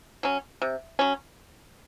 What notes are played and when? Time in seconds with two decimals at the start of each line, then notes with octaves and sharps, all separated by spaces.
0.23 F#3 C#4
0.62 C3
0.99 F#3 C#4